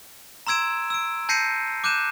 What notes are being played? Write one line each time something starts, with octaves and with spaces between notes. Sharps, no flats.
A#5 C6 E6 G#6 D7 E7
E6 D7
A5 G6 A#6 C7 C#7 D#7
D6 F#6 G6 D#7 E7